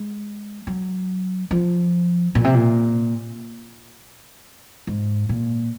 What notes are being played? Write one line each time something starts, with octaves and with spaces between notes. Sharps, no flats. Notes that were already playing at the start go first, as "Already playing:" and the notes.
Already playing: G#3
F#3
F3
A#2
C3
A#2
G#2
A#2